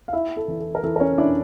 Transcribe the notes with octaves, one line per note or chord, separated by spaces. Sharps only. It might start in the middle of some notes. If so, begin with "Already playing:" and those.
F5
E4 E5
A4
E3
A4
A#4
E3 A4
A#4
C#4 C#5
D4 E4 D5